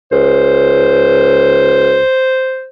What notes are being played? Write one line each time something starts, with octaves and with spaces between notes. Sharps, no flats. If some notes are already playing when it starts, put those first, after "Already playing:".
C#2 C5